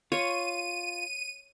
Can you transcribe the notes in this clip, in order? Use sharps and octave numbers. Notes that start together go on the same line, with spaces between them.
F4 C#5 D#7